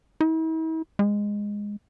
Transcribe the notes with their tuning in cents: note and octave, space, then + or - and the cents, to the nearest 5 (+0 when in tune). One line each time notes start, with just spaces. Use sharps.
E4 -45
G#3 -10